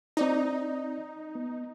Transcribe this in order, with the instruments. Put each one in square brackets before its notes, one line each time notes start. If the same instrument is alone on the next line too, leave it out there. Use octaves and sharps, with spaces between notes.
[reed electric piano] C4 D5 A#5 [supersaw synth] D#4
[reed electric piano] B3